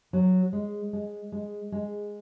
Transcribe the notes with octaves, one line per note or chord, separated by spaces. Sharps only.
F#3
G#3
G#3
G#3
G#3